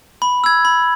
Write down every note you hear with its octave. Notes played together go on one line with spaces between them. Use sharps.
B5
E6 G#6
B5